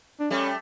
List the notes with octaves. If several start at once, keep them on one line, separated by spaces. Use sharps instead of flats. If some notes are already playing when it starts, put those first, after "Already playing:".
D4
G3 A3 C#4